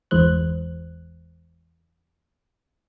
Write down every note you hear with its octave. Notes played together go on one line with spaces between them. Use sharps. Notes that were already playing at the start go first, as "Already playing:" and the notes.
G1 E2 E3 G#3 C5 F#6